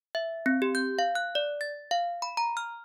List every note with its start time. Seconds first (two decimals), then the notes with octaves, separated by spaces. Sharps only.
0.15 E5
0.46 C4
0.62 G4
0.75 G6
0.99 F5
1.15 F#6
1.35 D5
1.61 A6
1.91 F5
2.22 B5
2.37 A#5
2.57 F6